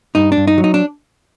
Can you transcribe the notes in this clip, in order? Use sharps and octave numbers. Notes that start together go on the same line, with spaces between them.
G2 D#4
D4
G2
D#4
F#3
D#4
D4